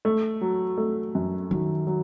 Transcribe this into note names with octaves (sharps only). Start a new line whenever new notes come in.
A3
F#3
A3
F#2
D#3 F#3
F#3